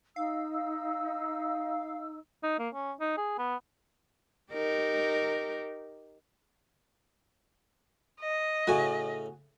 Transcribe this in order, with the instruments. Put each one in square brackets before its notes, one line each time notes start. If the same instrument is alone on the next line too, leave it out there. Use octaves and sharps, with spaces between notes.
[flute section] D#4 E6 [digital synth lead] F5
[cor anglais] D#4
A#3
C#4
D#4
G#4
B3
[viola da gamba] D#4 G4 A#4
[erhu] D#5
[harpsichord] A2 C#3 [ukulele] F#4 G#5